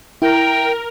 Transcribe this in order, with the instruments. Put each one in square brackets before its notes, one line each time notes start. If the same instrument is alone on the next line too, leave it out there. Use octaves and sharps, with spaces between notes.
[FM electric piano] E4 [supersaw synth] A#4 [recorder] G5